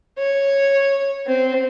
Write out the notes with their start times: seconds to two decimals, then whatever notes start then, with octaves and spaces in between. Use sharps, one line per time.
0.19 C#5
1.27 C4